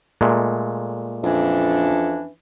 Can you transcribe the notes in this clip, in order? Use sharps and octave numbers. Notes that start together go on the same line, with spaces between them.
A#2 G#3 A3
F2 E3 C#4 D4